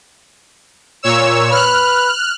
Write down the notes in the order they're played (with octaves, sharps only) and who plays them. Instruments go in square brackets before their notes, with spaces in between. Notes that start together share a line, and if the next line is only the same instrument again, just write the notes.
[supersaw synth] A#2 C#5 E6
[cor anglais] B4 [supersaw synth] F6 F#6